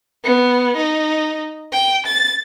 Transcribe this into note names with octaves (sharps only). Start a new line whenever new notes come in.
B3
D#4
G5
A6